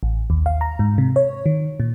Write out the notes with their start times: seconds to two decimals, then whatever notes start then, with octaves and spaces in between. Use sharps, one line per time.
0.03 A1
0.30 D#2
0.46 F5
0.61 A#5
0.79 G#2
0.98 C3
1.16 C#5
1.46 D#3
1.80 A#2